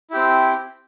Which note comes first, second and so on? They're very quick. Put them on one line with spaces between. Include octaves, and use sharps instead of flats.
E4 G4 C4